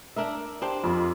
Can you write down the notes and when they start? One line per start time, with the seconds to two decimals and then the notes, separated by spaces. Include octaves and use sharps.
0.16 D4 A#4 E5
0.62 D4 G4 C5
0.84 F2 F4